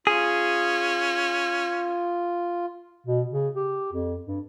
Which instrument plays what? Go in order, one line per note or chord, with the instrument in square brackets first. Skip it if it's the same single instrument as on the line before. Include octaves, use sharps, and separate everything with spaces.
[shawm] C#4 [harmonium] F4 [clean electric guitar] G#4
[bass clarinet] B2
C#3
G4
F2
G2